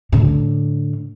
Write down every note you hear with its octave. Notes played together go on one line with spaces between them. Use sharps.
A2 D3